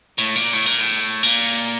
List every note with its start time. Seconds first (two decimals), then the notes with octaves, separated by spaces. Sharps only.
0.18 A2
0.36 A#2
0.53 A2
0.66 A#2
0.80 A2
1.23 A#2